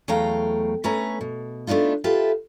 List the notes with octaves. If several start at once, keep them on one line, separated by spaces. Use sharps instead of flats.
E2 F#3 A3 F5 G5 A#5
A3 C#4 B4 C#5 G#5 A#5
B2
A3 B3 D4 D#4 F4
F4 G4 A4 B4 E5